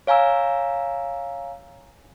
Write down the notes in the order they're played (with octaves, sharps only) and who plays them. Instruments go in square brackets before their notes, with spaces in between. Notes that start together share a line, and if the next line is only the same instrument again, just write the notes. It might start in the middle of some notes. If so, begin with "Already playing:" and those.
[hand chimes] C#5 F5 G#5 A#5 E6